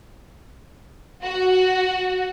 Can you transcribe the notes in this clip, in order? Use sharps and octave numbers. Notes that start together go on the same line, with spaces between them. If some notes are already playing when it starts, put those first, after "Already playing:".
F#4